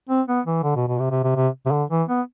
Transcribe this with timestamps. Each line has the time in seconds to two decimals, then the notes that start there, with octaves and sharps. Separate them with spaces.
0.09 C4
0.28 B3
0.46 E3
0.63 D3
0.76 B2
0.88 B2
0.99 C3
1.11 C3
1.24 C3
1.36 C3
1.66 C3
1.71 D3
1.90 E3
2.08 B3